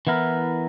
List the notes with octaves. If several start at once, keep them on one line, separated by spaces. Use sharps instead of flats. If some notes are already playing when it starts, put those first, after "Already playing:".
E3 B3 E4 A#4